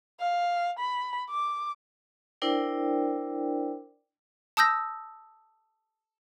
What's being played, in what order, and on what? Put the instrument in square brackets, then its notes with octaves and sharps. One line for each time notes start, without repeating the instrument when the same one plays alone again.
[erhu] F5
B5
D6
[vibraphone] D4 E4 A#4 C5 D5 G5
[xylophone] A5 D#6 E6 G6 A#6